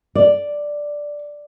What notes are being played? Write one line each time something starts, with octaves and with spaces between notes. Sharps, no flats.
D5